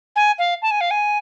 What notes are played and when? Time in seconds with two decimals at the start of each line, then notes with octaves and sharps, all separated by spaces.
0.16 G#5
0.39 F5
0.62 A5
0.71 G#5
0.81 F5
0.91 G#5